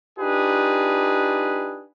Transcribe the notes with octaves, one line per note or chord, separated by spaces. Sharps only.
D4 D#4 F4 G4 G#4 B4